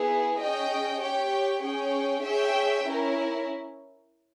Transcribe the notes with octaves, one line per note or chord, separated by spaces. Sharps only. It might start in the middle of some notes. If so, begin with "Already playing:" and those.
Already playing: B3 E4 G#4
C#4 G#4 D#5 G5
G4 C#5 G5
C#4 G#4 C#5 G5
G#4 C#5 E5 G5
C#4 E4 A#4